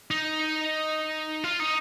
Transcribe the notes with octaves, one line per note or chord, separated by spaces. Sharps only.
D#4
F4
D#4